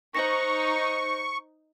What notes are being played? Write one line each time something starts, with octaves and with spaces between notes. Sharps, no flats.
D#4 C5 C#6 A#6